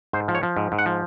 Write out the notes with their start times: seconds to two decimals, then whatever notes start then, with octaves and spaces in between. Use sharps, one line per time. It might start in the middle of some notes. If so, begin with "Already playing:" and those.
0.13 G#2 C5
0.28 F3
0.35 C#5
0.43 F3
0.56 G#2
0.72 G#2
0.79 F#5
0.86 F3